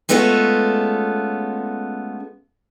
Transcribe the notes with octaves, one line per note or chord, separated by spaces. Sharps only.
G#3 A3 B3 C#4 F4 A4